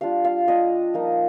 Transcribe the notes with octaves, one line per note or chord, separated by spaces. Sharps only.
G3 D4 F4 F5
F5
G3 D4 F4 D#5
F3 A#3 D#4